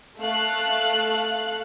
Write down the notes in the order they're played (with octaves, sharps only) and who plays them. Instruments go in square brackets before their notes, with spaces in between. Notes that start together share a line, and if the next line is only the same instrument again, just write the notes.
[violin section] A3 F5 F#6